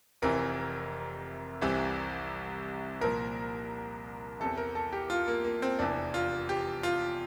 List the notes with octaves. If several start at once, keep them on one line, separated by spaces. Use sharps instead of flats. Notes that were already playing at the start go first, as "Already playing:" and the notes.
F1 F2 C3 E3 A#4
C2 C3 E3
C2 A#2 F3 A#4
E2 C3 E3 A4
A#4
A4
G4
F4
A#3
A#3
C4
F1 E2 E3 D4
F4
G4
F4